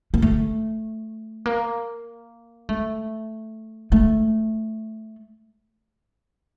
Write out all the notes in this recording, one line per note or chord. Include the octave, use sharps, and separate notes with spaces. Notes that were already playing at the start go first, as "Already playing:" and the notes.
A#3
A3
A#3
A3
A3